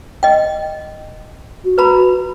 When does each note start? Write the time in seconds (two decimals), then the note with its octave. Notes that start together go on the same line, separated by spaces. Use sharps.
0.23 D#5 G5
1.65 F#4
1.78 B4 A#5 B5